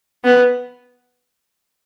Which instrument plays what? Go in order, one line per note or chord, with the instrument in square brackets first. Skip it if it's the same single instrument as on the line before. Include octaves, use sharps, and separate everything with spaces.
[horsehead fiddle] B3